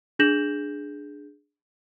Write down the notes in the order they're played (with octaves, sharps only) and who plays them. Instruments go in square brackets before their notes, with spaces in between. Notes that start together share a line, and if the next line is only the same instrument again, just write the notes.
[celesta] D4 G#4 G6 A#6 E7 F#7